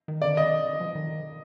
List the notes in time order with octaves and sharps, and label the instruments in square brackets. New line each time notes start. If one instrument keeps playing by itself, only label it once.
[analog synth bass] D#3
[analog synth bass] D3 [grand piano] D5
[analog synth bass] D#3 [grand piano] D#5
[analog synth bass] F3
D#3